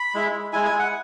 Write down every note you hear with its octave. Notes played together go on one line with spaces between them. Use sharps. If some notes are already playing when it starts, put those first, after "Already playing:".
Already playing: B5
G#3 E4
G#3 E4 G#5
G#5
F#5